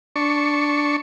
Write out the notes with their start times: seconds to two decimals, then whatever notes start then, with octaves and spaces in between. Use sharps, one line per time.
0.16 D4 C#6